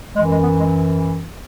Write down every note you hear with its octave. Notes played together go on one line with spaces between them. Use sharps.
F#2 E3 G#3
G#3
B3
G#3